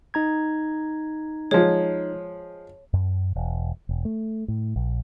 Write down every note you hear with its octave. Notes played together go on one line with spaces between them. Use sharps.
D#4 A#5 G#6
F3 G#3 C#5
F#2
E1
E1
A3
A2
A#1